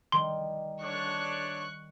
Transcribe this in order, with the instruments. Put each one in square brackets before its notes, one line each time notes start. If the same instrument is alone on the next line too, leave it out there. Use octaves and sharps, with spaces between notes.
[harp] D#3 G3 [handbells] C6
[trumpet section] D4 A4 C#5 [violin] C#6 F#6